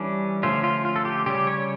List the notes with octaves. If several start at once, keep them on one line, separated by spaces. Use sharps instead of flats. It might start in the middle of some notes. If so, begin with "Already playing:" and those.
Already playing: E3 G3 C#4 D4
D3 F3 A3 C#4 F4
F4
F4
A4
G4
C#3 G3 C#4 G4
C#5